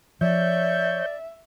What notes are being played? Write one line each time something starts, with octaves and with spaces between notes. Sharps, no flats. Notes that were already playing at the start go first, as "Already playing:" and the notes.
F3 C#5 D5 E5 G6